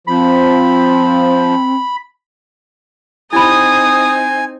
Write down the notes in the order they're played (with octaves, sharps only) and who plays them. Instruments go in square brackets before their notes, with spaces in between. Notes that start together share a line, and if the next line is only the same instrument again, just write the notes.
[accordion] F3 [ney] C4 [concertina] B5
[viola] C4 D#4 [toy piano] E4 G4 B5 [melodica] G#5 [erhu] D#6